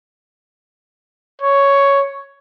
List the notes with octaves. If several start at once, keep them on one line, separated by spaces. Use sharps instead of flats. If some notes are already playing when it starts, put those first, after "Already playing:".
C#5